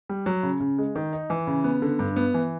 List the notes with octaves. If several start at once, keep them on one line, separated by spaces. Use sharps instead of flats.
G3
F#3
C#3
C#3
G#3
D#3
D#4
E3
C#3
B3
D3
G2
B3
E3